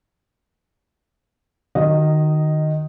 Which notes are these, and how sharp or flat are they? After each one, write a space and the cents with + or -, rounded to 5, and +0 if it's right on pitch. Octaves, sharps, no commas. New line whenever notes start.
D#3 -25 F#4 +0 D#5 +0